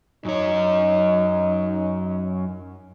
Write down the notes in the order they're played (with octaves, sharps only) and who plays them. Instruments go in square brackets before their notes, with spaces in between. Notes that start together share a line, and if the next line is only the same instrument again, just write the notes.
[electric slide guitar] F#2 C#5 [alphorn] D#4